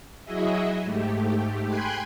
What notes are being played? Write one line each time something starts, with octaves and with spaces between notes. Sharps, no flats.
F#3 E4 F#4 G#4 D#5 E5
G#2 A3 G4
G5 G#5 B5 C6 F#6 G#6